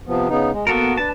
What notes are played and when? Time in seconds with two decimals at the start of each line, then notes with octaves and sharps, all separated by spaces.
0.07 C3 F3 B3
0.29 C#3 B3 D#4
0.52 G#3
0.67 A#3 B3 F#4 A4 A#4
0.97 D4 B4 A5